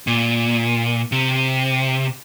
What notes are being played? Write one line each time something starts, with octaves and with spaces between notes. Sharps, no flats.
A#2
C3